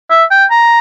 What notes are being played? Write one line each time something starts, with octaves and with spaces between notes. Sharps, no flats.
E5
G5
A#5